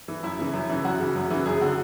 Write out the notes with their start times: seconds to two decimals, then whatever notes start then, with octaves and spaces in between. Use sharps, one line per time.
0.08 E3
0.23 F#2 E4
0.38 C#3 E3
0.54 F#2
0.69 C#3 E3
0.84 F#2 F#4
1.00 C#3 E3
1.16 F#2
1.30 C#3 E3
1.46 F#2 G#4
1.61 D3 F#4